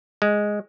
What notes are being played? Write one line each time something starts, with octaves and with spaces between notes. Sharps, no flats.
G#3